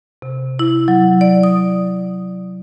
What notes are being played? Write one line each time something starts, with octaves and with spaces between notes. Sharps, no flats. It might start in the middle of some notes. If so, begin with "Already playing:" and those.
C3
E4
F#3
D5
D#6